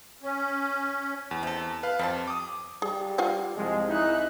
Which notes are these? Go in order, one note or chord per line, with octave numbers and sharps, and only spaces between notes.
C#4
E2
C3 A4
B4 F5
F2 G3 C4 A5
D6 D#6
G3 G#4
F4 F5 F#5
C2 F3 G#3
C2 D#4 E4 E5 F#6